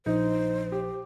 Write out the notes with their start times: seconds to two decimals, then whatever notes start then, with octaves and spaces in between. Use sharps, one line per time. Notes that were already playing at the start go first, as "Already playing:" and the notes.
0.06 A#1 D#4 C5
0.72 G4